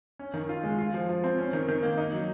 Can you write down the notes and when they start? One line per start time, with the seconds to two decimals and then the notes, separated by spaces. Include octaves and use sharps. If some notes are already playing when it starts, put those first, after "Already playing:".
0.19 C#4
0.34 D#3
0.49 F4
0.64 G#3
0.78 F4
0.94 F3
1.09 F3
1.24 C4
1.38 C#4
1.53 D#3
1.68 D#3
1.83 A#3
1.98 D#4
2.13 F#3